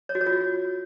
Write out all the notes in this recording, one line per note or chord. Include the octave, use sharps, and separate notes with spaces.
C#5
F#4
C#5
F4
F#4